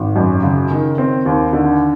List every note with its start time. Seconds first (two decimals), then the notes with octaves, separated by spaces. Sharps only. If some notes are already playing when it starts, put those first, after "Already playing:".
Already playing: G#1
0.16 F#2
0.43 C#3
0.71 D#3
0.98 C4
1.26 D#2
1.53 D3